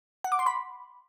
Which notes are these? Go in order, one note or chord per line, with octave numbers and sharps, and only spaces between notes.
F#5
D6
C6
B5